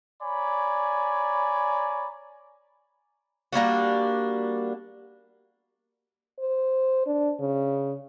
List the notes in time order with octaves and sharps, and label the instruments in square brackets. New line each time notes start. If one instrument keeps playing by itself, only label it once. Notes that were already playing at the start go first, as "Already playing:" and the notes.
[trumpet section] C#5 D5 G#5 A#5 B5
[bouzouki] G3 A#3 D4 F#4
[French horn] C5
D4
C#3